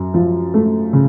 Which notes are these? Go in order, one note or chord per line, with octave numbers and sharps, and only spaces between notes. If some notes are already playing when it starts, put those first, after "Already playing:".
Already playing: F#2
F3
A3
C#3